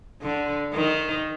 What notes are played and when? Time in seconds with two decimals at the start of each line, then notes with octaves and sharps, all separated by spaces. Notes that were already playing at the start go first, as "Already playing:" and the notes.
0.22 D3
0.73 D#3